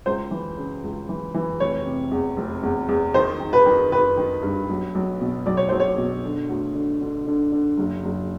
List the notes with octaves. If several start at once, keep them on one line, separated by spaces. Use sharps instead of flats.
C#2 C5
E3
C#3
C#2
E3
E3
F1 C#5
C3
E2
F1
E2
E2
D#3 C5
D#3
B4
D#3
D#3 B4
D#3
G2
B1
B1
B2
B1 D5
C#5
B1 C5
C#5
B2
D3
D2
D3
D3
D3
D3
F#1
F#1